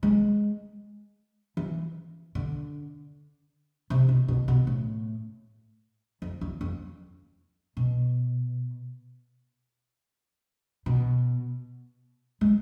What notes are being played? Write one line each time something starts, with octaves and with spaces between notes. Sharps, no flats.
G#3
E3
D3
C3
B2
B2
B2
A2
F2
E2
F2
B2
B2
G#3